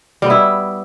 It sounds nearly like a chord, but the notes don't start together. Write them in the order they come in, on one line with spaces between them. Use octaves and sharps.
G3 B3 E4